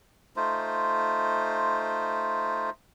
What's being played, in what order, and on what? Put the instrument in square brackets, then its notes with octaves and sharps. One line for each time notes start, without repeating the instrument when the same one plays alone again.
[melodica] A3 D#4 F4 C5